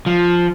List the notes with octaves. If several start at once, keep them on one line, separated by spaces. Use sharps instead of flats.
F3